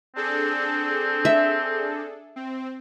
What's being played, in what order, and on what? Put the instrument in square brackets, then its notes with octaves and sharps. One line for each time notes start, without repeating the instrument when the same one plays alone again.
[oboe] C4 [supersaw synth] D4 G#4 A4
[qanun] E5
[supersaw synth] C4